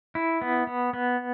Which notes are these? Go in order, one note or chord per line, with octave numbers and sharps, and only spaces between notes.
E4
B3
B3
B3